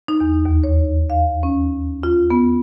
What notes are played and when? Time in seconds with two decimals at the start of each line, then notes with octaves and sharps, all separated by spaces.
0.08 D#4
0.20 E2
0.45 D#2
0.64 C#5
1.10 F5
1.43 C#4
2.03 F4
2.30 B3